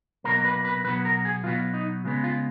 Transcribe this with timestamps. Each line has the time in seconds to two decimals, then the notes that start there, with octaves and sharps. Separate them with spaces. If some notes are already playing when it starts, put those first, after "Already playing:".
0.24 B2 F#3 A#3 A#4
0.45 B4
0.65 B4
0.84 B2 F#3 B3 B4
1.05 A#4
1.25 G#4
1.44 B2 F#3 B3 F4
1.74 D#4
2.05 C#3 G#3 B3
2.24 F4